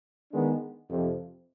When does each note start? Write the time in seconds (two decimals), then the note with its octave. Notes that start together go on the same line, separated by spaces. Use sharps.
0.32 D#3 G#3 B3 D4
0.89 F2 C3 F3 C4